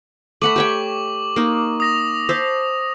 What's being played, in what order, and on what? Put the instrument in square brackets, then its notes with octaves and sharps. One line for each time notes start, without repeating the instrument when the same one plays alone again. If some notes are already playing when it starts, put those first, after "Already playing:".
[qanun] A3 F#5 B5 [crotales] C#6 D6 F#7
[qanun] G4 C#5 G5
A#3 D#4
[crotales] D#6 A#6 F7
[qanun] C5 E5 A5